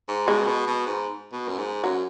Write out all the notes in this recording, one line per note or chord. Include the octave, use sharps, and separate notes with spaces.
G#2
B2 G#3
C#3
B2
B2
G#2
B2
F#2
G#2
F#2 F#3